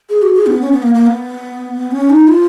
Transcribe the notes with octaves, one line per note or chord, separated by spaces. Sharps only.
G#4
F#4
G#4
B3
C#4
B3
A#3
A#3
B3
C#4
D#4
F4